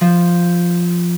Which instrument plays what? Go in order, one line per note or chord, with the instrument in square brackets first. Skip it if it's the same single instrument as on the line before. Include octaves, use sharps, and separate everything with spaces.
[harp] F3